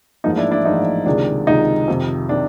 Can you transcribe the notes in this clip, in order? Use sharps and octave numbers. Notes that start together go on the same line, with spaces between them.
A1 G#2 F3 A#3 D#4
D4 E4
D4 E4
A1 G#2 F3 A#3 D#4
C#2 C3 D#3 G#3 D4
C#2 C3 D#3 G#3 D#4
F2 C3 D#3
C3 D#3 D4